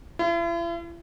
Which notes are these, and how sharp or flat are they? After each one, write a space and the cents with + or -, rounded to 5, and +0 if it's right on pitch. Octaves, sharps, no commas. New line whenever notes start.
E4 +45